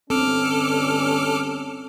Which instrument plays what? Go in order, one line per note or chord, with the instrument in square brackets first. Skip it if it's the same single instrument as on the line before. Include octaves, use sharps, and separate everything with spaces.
[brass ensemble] G1 C#4 [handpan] C4 [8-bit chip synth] A4 D6 F6